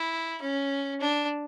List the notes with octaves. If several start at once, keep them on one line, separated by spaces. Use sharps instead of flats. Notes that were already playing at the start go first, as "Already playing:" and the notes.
Already playing: E4
C#4
D4